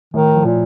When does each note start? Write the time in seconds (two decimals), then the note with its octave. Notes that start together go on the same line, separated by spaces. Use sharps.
0.14 A2 D#3
0.34 F3
0.45 A#2